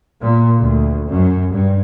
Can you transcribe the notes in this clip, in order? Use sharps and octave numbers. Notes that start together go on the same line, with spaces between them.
A#2
D2
F#2
G2